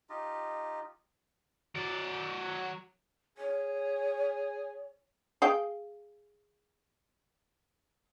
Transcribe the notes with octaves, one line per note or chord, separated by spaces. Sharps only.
D#4 F4 G4 D#5
F#3 D5
G#4 C#5
G#4 F5 G5